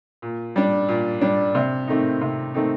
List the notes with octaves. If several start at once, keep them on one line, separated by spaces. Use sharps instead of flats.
A#2
G3 D4
A#2
G3 D4
C3
D#3 A3 C4 D#4
C3
D#3 A3 C4 D#4